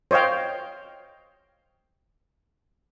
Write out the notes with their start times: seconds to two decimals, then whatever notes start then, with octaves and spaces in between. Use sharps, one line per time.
0.11 C5 C#5 D#5 F5 G5